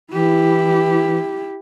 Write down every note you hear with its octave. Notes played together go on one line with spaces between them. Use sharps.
E3 E4 G4